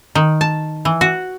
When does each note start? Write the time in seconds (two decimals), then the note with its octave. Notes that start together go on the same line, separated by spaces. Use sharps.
0.15 D#3
0.41 A5
0.85 E3
1.01 F#4